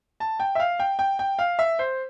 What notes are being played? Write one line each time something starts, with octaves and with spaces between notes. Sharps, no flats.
A5
G5
E5
F5
G5
G5
G5
F5
E5
C5